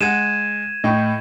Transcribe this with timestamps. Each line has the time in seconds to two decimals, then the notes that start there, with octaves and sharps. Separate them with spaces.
0.01 G#3 F#5 G#6 D#7 E7
0.84 A2 D#5 G5 C#6